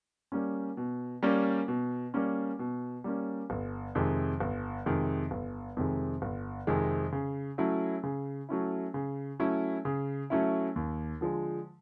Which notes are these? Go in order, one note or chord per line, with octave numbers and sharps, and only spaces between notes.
G3 A#3 C#4
B2
G3 A#3 C#4
B2
G3 A#3 C#4
B2
G3 A#3 C#4
G1
F2 C3 D#3 G#3
G1
F2 C3 D#3 G#3
G1
F2 C3 D#3 G#3
G1
F2 C3 D#3 G#3
C#3
F#3 A3 C#4 E4
C#3
F#3 A3 C#4 E4
C#3
F#3 A3 C#4 E4
C#3
F#3 A3 C#4 E4
D#2
D3 F3 G#3